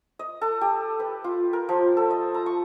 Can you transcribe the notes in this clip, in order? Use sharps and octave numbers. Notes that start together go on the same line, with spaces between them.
D#5
A4
G4
B4
F4
A#4
F3
A4
D#5
A#5
C#6